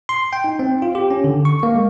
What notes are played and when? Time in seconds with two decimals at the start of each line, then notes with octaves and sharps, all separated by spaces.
0.09 C6
0.33 G5
0.44 D#4
0.59 C4
0.82 F4
0.95 G4
1.11 C#4
1.24 D3
1.45 C#6
1.63 A#3
1.75 G#3